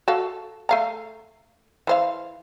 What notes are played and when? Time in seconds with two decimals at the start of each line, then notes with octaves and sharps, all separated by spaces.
0.08 F#4 A4 F5
0.69 A3 F5 A#5
1.87 E3 C5 F5